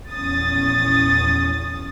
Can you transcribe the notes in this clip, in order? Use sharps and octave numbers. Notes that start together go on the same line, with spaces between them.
A#1 E2 C#4 D#6 A6